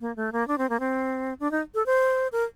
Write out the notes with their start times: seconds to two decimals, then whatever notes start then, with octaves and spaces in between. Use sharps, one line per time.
0.01 A#3
0.16 A3
0.32 A#3
0.48 D4
0.58 C4
0.70 A#3
0.80 C4
1.40 D4
1.51 D#4
1.75 A4
1.86 C5
2.32 A#4